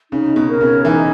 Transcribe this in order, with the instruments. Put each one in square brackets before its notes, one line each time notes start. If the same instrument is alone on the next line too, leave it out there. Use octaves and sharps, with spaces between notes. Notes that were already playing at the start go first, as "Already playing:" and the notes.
[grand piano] C#3 [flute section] D#4
[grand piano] B2
[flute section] A#4 C#5
[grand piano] C#3
[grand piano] E3 [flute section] D#4